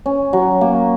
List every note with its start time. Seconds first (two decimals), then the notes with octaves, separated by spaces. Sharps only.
0.06 C#4
0.33 F#3
0.61 A#3